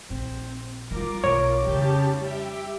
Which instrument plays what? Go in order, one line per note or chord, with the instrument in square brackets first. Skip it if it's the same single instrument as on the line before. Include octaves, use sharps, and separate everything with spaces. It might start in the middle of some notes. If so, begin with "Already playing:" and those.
[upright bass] A#1 [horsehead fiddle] C4
[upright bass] F3 G3 [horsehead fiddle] F4 A#4 [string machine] D6
[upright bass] B1 C4 [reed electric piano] C#5
[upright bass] F2 [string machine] C#3 A5 [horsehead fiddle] G4
[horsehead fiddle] G3 [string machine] G4 E5